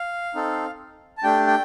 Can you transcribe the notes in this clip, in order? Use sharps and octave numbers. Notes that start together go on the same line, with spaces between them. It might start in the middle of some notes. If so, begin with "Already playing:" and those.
Already playing: F5
C4 D#4 A4
A5
A3 D4 G4 G5
G5